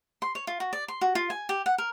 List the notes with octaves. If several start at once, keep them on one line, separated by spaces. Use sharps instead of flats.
C6
C#5
F4
F#4
D5
C6
F#4
F4
G#5
G4
F#5
A#4